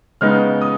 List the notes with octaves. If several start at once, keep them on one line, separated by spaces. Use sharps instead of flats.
C#3 G#3 B3 D#4 F6
D#6